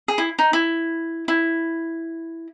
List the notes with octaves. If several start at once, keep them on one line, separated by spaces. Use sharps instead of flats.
G#4
E4
D#4
E4
E4